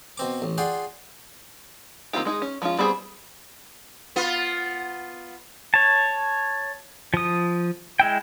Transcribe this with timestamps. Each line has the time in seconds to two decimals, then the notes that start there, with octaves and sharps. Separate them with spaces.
0.18 B2 C4 D6
0.42 A1
0.58 F4 G#4 D5 F#5 G5 C6
2.13 D#3 A#3 C4 F4 G4
2.25 G#3 D#4 G#4
2.42 C#4
2.62 F3 G#3 C#4 F4
2.79 G3 B3 C4 G#4 C5
4.16 B3 F4
5.74 C#5 A5
7.14 F3 D#6
8.00 G#3 E4 G5